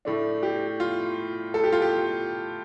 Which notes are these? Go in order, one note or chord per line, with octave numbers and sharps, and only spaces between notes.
A2 A3 D4
G4
F4
A4
G4
F4
G4